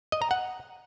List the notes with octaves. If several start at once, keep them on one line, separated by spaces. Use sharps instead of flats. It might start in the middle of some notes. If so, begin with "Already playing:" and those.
D#5
A#5
F#5